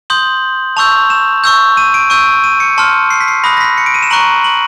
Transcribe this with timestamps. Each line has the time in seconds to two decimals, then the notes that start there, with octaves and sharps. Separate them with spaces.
0.10 C6 D#6 G6 F#7
0.77 A5 C#6 E6 G6 F7
1.10 E7
1.44 C#6 E6 G6
1.77 D#7
1.94 D7
2.10 C#6 E6 G6 D#7
2.44 D#7
2.60 C#7
2.78 A5 C6 F6
3.10 C7
3.20 B6
3.28 C7
3.44 B5 D#6 F#6 A#6
3.57 A#6
3.60 B6
3.78 C#7
3.86 D7
3.94 D#7
4.03 E7
4.11 A#5 C#6 F#6 F#7
4.44 F#7